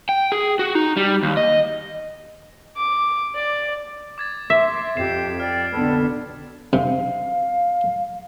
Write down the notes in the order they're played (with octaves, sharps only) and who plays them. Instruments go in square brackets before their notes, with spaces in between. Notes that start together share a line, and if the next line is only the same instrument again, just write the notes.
[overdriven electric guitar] G5
G#4
F#4
D#4
G3
D#2
D#5
[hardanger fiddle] D6
D5
[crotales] D6 G#6 A6
[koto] E5 [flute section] C6 D6 [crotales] B6
[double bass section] F2 [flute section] G4 [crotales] C7 E7
[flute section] D5 G5 [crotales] F6
[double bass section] B1 B2 D3 [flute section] A4 B4
[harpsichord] C3 [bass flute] F5